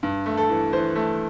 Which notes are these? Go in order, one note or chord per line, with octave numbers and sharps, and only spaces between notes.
G2
A3
A4
E3
E3 C5
A3